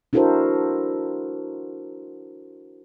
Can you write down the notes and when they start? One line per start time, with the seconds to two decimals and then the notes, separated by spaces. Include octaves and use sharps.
0.13 D4 E4 F#4 A4 A#4 C5